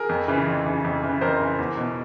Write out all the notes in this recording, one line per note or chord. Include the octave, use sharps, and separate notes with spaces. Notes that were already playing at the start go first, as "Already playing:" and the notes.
Already playing: G#4 A#4
F2
C#3 E3
F2
C#3 E3
F2
C#3 E3
F2 A#4 C5
C#3 E3
E2
B2